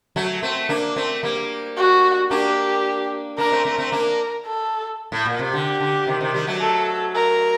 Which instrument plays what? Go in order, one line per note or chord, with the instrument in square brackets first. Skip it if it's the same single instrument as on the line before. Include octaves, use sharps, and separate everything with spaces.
[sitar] F#3 A3
A3 C4
A#3 D4
A3 C4
G3 A#3
[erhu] F#4
[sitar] A#3 D4 [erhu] G4
[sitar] A#3 D4 [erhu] A#4
[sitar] A3 C4
A3 C4
A3 C4
[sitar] A#3 D4 [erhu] A#4
[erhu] A4
[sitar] A2
A#2
C3
[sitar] D3 [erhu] G4
[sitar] D3
C3 D#3
C3 D#3
D#3 G3
F#3 A3
[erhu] A4
A#4